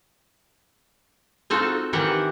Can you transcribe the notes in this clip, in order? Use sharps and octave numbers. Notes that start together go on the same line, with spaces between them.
C4 D#4 F4 F#4 A4
D#3 E3 G4 A#4 F#5